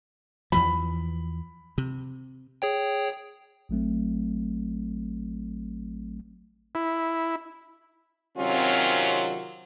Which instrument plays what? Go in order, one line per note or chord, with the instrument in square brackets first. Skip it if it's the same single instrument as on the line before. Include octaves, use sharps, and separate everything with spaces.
[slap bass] E2 E3 F3 [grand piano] B5
[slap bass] C3
[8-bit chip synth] G#4 C#5 G5
[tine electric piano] A1 F#3 A3 C4
[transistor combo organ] E4
[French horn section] C3 D#3 F#3 C4 C#4 F4